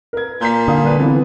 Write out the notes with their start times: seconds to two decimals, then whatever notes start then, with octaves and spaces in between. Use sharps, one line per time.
0.13 A#4 B4 G#6
0.41 A#2 G6 B6
0.68 D3 F5 D#6
0.82 G3 B4
0.99 E3 B3 C4